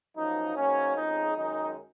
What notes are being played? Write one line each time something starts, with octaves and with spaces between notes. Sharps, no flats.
F#2 F3 A#3 D#4
G#2 F#3 A#3 C#4
F2 C#3 G#3 D#4
F#2 D#3 G#3 D#4